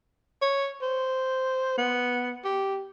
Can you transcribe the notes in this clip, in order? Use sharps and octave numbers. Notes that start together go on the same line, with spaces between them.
C#5
C5
B3
G4